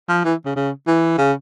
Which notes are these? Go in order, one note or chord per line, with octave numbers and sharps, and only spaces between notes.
F3
E3
C#3
C#3
E3
C#3